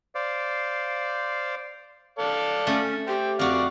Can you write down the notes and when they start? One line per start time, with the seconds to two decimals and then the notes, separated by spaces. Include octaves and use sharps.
0.15 C5 D5 F5
2.19 A4 D5 F5
2.67 A3 C#4
3.08 G4 C5 G5
3.39 F2 F#4 D5 F5